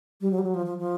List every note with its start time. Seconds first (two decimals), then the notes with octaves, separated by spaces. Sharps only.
0.21 G3
0.31 F#3
0.39 G3
0.44 F#3
0.54 F3
0.66 F3
0.78 F3